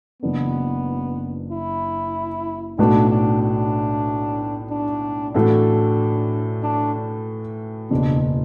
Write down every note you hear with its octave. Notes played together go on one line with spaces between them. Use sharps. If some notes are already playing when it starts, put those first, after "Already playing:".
F#1 F#2 E3 B3 D4
E4
B1 A2 A3 D4 F#4 B4
D4
D4
D4
A2 E3 A3 D4 F#4 A4
D4
F#1 E2 B2 D4